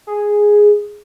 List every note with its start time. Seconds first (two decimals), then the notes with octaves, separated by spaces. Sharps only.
0.07 G#4